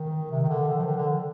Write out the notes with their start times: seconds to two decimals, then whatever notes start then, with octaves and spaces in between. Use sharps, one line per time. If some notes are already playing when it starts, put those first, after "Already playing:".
Already playing: D#3
0.31 C3
0.43 D#3
0.49 D3
0.69 D#3
0.78 F3
0.87 D#3
0.96 D3